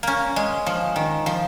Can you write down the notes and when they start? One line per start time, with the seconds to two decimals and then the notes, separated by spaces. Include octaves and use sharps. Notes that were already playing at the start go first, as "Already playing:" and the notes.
0.03 A#3 C#4
0.36 G#3
0.66 F3
0.96 D#3
1.26 F3